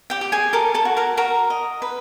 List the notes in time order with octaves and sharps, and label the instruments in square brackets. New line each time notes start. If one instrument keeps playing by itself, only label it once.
[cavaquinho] G4 G5
G4
G#4 G#5
A4 A#4 A5
A4 A5
F#4
A#4 A#5
F#4 A#4 A#5
D#5
B4